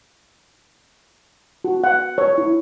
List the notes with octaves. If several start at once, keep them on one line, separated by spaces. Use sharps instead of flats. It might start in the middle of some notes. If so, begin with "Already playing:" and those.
F#4
F#5
C#5
E4